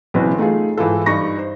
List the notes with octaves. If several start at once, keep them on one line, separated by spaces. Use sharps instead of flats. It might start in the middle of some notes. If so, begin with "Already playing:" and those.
B1 C#3 E3 C4 B4
A3 D#4 F4 G#4
G#2 E3 E4 F4 A4
G2 D#4 C#6 A#6
C5